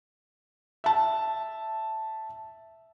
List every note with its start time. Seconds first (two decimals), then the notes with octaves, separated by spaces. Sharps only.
0.84 E5 A5